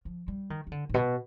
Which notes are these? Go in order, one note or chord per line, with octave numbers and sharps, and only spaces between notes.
F3
G3
D#3
D#3
D3
G#2
B2